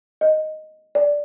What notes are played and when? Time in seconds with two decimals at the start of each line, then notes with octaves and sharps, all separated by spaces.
0.21 D#5
0.95 D5